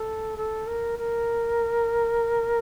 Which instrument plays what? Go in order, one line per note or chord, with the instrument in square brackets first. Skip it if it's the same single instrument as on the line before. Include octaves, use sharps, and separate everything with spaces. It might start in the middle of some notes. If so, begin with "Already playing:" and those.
Already playing: [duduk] A4
A4
A#4
A#4